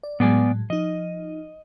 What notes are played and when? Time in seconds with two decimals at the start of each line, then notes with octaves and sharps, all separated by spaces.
0.03 D5
0.20 A2 F#3 G#3 B3 D5 G#5
0.70 F3 D#4 D#5